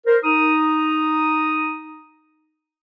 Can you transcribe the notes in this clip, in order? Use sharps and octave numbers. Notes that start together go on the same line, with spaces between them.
A#4 C5
D#4 A#5 D#6